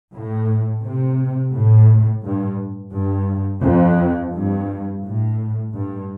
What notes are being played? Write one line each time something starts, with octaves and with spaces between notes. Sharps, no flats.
A2
C3
A2
G2
G2
F2
G2
A2
G2